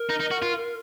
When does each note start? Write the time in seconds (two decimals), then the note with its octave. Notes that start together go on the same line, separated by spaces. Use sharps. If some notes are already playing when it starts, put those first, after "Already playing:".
Already playing: A#4
0.09 D#4
0.20 D#4
0.31 F#4
0.42 F4